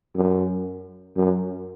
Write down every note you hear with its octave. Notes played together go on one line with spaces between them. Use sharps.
F#2
F#2